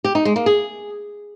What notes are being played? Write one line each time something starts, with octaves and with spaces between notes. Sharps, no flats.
G4
D#4
G#3
A#3
G#4